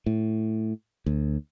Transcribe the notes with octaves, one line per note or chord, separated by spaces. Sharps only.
A2
D2